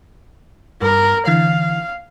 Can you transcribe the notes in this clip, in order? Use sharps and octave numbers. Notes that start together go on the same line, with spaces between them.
G2 A#4
D3 E3 F5